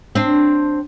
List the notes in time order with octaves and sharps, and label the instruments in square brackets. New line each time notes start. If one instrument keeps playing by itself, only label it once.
[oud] C4 D4